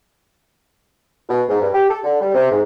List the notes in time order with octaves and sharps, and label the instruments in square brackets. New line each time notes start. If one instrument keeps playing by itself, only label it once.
[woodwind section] B2
G#2
G2
G4
A4
D3
G3
C3
G#2